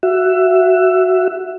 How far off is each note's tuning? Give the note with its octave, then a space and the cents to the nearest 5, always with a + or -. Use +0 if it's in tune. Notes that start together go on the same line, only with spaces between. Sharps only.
F#4 +0 E5 +15